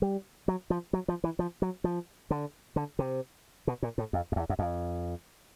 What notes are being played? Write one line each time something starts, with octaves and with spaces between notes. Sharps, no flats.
G3
F#3
F3
F#3
F3
E3
F3
F#3
F3
D3
D3
C3
B2
A#2
A2
F2
F2
E2
F#2
F2